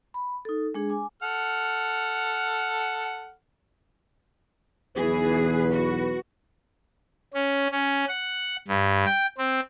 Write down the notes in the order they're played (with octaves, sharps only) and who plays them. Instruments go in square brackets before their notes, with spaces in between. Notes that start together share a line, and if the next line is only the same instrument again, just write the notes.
[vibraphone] B5
D#4 A4
G#3 D4 G#4
G#5 D6
[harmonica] A4 F#5 F6
[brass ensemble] B1 E2 B4 [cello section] E3 G#4
[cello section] F#4
[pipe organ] C#4
C#4
F#5
G2
G5
C4